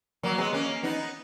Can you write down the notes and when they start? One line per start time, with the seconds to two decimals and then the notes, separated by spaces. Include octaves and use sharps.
0.23 F#3 A#3
0.38 G#3 B3
0.53 A#3 C#4
0.83 B3 D#4